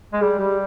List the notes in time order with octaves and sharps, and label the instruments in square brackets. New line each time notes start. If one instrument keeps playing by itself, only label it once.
[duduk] G#3
[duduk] G3 [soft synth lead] G#4
[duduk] G3 [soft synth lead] G4